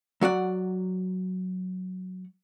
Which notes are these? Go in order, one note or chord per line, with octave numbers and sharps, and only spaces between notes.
F#3 F#4 D5 F#5